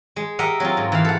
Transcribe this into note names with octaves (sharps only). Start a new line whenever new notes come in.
G#3
G4 A#4 D#5 E5 F#5
F#3 C4 F4
G#2
E3 F5
A4 F#5